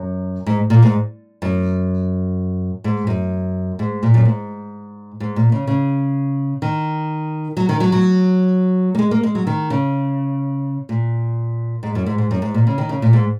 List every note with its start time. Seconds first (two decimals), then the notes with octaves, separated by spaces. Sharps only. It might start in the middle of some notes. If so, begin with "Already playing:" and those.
Already playing: F#2
0.46 G#2
0.70 A#2
0.82 G#2
1.42 F#2
2.84 G#2
3.07 F#2
3.79 G#2
4.03 A#2
4.14 F#2
4.25 G#2
5.20 G#2
5.36 A#2
5.52 C#3
5.67 C#3
6.62 D#3
7.57 F#3
7.69 D#3
7.80 F#3
7.92 F#3
8.95 A#3
8.99 G#3
9.11 A#3
9.23 G#3
9.35 F#3
9.47 D#3
9.70 C#3
10.89 A#2
11.83 G#2
11.95 F#2
12.06 G#2
12.18 G#2
12.31 F#2
12.42 G#2
12.54 A#2
12.67 C#3
12.78 D#3
12.89 C#3
13.02 A#2
13.13 G#2